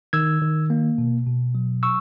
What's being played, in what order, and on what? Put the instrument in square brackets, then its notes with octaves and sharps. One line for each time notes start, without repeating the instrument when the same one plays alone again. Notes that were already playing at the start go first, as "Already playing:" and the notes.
[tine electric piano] D#3 E6 G#6
D#3
A#3
B2
B2
F#3
C#6 E6